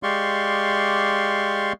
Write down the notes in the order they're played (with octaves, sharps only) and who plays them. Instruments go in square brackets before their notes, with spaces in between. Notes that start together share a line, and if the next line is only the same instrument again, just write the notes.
[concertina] G#3 G4 D5 F5 C6 C#6